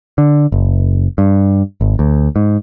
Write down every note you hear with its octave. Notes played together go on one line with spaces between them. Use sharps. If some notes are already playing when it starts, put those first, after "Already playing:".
D3
F#1
G2
G#1
D2
G#2